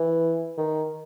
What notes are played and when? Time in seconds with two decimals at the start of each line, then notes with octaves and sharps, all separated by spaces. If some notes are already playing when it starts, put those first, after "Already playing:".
Already playing: E3
0.58 D#3